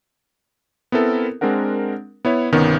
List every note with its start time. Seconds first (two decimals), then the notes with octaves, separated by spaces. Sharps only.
0.92 B3 C4 E4 A4 A#4
1.41 G#3 C4 D4 A#4 F#5
2.25 B3 E4 C#5
2.53 G1 C2 D#3 B3 C#4